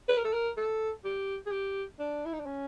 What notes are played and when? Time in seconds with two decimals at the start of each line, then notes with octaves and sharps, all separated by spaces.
0.09 B4
0.17 A#4
0.25 A4
0.33 A#4
0.57 A4
1.05 G4
1.46 G#4
1.51 G4
1.99 D4
2.25 E4
2.33 D#4
2.40 D4
2.46 C#4